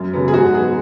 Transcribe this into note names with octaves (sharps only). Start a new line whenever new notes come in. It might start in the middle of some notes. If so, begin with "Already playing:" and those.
Already playing: F#2
C#3 F#3 B3
G#4
G#2 F#4
F#3 B3 G#4